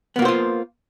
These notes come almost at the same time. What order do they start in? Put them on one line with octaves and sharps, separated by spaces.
B3 A#3 F#4 C5 F4